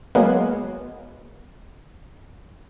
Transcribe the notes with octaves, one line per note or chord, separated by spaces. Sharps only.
F#3 G#3 A#3 B3